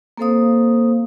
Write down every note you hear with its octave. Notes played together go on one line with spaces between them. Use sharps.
A#3 C4 A4 C5 F5 D#6